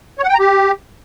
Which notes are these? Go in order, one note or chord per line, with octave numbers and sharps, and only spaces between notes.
C#5
F#5
G5
A#5
G4